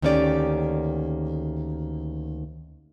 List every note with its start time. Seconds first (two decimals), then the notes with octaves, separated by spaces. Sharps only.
0.02 D2 D#3 A#3 C#4 G4 D5